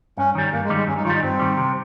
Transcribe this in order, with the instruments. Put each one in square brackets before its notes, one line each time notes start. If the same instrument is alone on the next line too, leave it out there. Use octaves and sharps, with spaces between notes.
[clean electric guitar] G2 [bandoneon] C#4
[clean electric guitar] D#3 G3
[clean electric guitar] G2 [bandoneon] A#3
[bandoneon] G#3
[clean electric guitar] D#3 G3
[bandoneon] G#3
[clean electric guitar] G2 [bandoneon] C#4
[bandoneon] D#4
[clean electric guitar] D#3 [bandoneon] F4
[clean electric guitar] G3 [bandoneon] D#4
[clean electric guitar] G2 [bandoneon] C4
[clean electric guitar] D#3 G3
C3